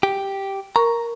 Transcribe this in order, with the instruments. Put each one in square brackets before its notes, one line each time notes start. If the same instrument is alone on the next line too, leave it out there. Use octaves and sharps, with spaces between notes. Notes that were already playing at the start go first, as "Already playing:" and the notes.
[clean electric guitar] G4
[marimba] A#4 C#6 [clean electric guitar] A#5